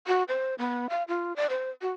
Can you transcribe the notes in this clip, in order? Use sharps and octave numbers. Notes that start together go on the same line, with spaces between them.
F#4
C5
B3
F5
F4
D5
C5
F#4